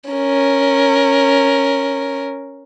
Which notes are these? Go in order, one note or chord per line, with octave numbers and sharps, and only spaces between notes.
C#4 A#4